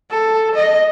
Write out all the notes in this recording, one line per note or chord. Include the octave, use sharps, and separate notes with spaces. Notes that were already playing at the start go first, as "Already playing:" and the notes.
A4
D#5